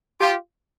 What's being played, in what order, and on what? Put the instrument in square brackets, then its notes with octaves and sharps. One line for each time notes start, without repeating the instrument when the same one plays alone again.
[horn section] F4 G4